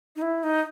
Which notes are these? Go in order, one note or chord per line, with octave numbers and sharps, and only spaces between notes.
D#4
E4
D#4